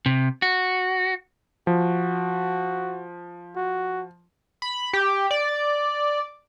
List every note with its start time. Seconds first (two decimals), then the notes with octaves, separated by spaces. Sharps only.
0.06 C3
0.42 F#4
1.67 F3 F#4
3.56 F#4
4.62 B5
4.93 G4
5.31 D5